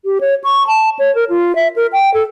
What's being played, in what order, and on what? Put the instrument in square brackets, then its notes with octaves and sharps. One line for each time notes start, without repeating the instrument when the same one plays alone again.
[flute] G4
C#5
C#6
A5
C#5
A#4
F4
E5
A#4
G5
A4